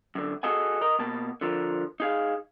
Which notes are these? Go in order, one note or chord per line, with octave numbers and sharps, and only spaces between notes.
F#2 D3
F#4 G#4 A4 D#5 F#5 G#5
A#4 D#5
B2 A#3 A5
D3 F3 A#4
D#4 G#4 F5